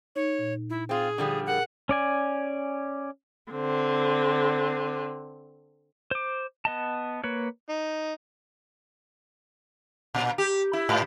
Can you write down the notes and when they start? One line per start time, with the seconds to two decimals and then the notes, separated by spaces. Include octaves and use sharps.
0.16 D#4 C#5
0.39 A#2
0.70 E4
0.89 C4 F4 G#4
1.18 D3 F3 G3
1.46 G#4 A#4 F#5
1.89 C#4 D5 G#5
3.52 D3 C4
6.11 C5 D6
6.65 B3 D#5 A5
7.24 A#3 B4 C#5
7.69 D#4
10.14 A#2
10.38 G4
10.73 E4
10.89 G#2